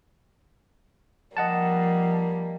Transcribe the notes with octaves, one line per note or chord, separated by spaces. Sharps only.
F3 G3 A#3 D#5 F#5 A5